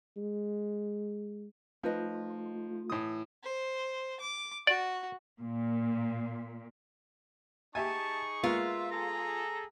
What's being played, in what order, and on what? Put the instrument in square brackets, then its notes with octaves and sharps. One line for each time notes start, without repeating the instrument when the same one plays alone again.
[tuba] G#3
[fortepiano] F3 [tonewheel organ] A3 F4 [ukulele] D#4 B4 D#5
[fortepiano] A2 E3 D#6
[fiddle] C5
D6
[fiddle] F#4 [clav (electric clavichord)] D5
[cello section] A#2
[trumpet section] D#4 G#4 C#6 [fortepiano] G4 E5 G#5 [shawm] A5
[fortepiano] G#3 A#3 B3 [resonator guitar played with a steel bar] F4 [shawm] E5
[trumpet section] G#4 A4 [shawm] A#5